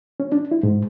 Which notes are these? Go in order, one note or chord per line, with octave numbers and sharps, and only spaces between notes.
C#4
D4
E4
G#2